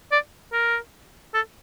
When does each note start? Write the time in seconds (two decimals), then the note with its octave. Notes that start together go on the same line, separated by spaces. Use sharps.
0.12 D5
0.53 A#4
1.34 A4